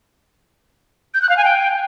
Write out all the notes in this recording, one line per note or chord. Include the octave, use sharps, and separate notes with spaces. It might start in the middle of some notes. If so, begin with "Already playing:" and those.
G6
F#6
F5
G#5
G5